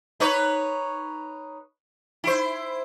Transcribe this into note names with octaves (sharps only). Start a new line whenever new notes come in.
D#4 B4 C#5
E4 C5